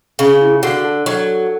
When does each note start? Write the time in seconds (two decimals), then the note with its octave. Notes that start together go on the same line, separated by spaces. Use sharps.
0.19 C#3 C#4
0.41 E4
0.56 G#4
0.63 D3 F#4
0.85 A4
1.06 F#3